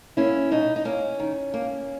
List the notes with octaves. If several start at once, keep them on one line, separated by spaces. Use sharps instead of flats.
A#3 C#4 E4
B2 D#4
D#4
A#3 C#4
D#3
A#3